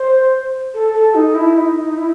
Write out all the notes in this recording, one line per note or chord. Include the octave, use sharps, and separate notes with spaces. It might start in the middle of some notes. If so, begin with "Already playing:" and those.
Already playing: C5
A4
A4
D#4
E4
D#4
E4